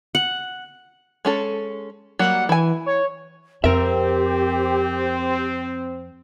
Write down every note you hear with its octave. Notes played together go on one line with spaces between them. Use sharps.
F#5
G#3 C#4 A4
F#3 G3 A#3 F#5
E3 E4 G#5
C#5
F2 C4 G4 A#4 E5